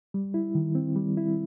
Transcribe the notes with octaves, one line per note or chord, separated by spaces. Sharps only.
G3
E4
D#3
C4
G3
E4